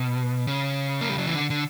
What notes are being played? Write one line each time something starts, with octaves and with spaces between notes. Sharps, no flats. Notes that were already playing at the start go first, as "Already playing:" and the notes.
Already playing: B2
C#3
A#3
G3
F#3
E3
D3
D3